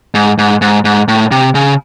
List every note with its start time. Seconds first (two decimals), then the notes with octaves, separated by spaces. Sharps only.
0.15 G#2
0.38 G#2
0.62 G#2
0.85 G#2
1.08 A2
1.31 C3
1.55 C#3